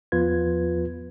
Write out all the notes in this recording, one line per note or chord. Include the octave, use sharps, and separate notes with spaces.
E2 F3 B3 F4 B4 G#6